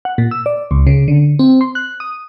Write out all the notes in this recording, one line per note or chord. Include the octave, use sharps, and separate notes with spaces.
F#5
A#2
E6
D5
C#2
C#3
D3
C4
C6
F#6
D#6